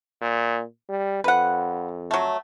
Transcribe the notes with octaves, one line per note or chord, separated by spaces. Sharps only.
A#2
G3
F2 B4 F#5
F#3 A3